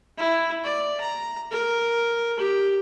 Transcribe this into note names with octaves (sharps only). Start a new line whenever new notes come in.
E4
D5
A#5
A#4
G4